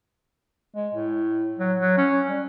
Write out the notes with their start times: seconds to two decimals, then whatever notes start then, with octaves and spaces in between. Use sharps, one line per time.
0.76 G#3
0.94 A2
1.59 F#3
1.80 F#3
1.97 C#4
2.28 G3